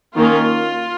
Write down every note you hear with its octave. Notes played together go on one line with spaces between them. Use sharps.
D#3 A#3 C#4 F4